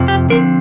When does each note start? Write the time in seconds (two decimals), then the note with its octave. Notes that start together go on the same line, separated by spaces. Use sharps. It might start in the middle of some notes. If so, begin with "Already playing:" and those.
Already playing: F2 C3 F3
0.08 G4
0.30 D3 F3 C4 A#4